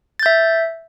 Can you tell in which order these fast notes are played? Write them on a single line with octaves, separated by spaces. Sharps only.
A6 G6 E5